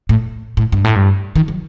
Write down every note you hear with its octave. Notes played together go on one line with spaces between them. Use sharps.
A2
A2
G2
A2
G2
D#3
F#3